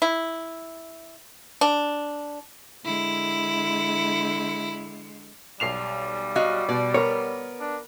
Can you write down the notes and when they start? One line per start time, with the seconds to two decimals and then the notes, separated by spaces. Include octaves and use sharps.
0.02 E4
1.61 D4
2.84 D3 G#3 E4
5.60 B1 G3 C7 F7
6.36 F#4 D#5 F5
6.69 B2 D5
6.94 B3 A#4 C#5
7.60 D4